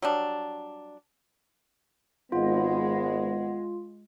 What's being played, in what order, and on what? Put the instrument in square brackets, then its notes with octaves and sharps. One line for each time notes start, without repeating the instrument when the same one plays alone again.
[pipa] F#3 G3 D4
[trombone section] G#1 B3 [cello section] G#3 [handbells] F4 [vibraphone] D#5 F#5